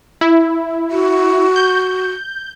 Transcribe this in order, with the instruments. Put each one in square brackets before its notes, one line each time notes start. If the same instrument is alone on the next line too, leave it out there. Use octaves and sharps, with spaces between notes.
[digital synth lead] E4
[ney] F#4
[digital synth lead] G6